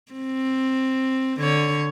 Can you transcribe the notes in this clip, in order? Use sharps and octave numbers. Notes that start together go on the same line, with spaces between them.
C4
D3 C#5